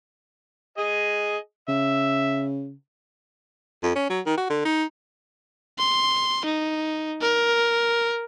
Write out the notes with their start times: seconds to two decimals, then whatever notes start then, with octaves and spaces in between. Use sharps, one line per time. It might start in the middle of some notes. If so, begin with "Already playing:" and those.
0.78 G#4 D#5
1.69 C#3 E5
3.83 F2
3.96 C#4
4.10 F#3
4.26 D#3
4.38 F#4
4.50 D3
4.65 D#4
5.79 C6
6.45 D#4
7.21 A#4